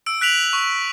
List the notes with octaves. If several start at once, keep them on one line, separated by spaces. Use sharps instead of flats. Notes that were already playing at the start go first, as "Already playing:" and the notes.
E6 D7
F#6 B6 D7 F7 F#7
C#6